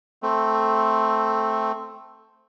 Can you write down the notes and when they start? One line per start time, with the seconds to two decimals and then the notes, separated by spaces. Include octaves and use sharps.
0.23 A3 C4